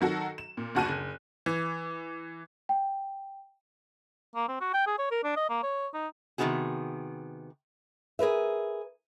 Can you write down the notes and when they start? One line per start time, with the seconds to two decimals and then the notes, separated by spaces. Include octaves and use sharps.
0.01 D#3 F#3 F#4 A4
0.38 E7
0.57 A#2
0.75 F#1 D2 F#4 A5 F#6 D#7
0.89 F#1
1.46 E3
2.69 G5
4.36 A#3
4.48 C4
4.61 F#4
4.74 G5
4.87 G#4
4.99 C#5
5.11 A#4
5.24 D4
5.37 D#5
5.50 A#3
5.63 C#5
5.94 D#4
6.38 C3 D#3 A#3 B3 F#4 G#4
8.19 G#4 A#4 B4 E5